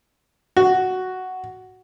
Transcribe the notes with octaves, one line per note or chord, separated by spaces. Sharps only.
F#4